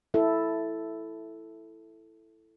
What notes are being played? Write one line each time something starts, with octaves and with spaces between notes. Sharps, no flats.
E4 A4 E5